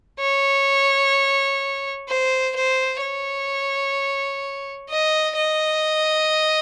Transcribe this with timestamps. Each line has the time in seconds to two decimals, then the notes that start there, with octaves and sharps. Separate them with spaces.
0.20 C#5
2.08 C5
2.56 C5
3.02 C#5
4.90 D#5
5.37 D#5